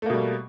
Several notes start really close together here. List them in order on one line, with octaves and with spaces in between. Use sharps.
A3 A#3 B2 G3